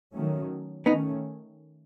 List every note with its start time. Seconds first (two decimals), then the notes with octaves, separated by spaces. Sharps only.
0.15 D#3 F#3 A3 C#4
0.86 D#3 A3 B3 C#4 D#4